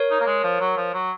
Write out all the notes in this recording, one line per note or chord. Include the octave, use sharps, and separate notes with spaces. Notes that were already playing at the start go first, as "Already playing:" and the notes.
Already playing: A#4 C#5
D#4
A#3
G#3
F3
F#3
F3
F#3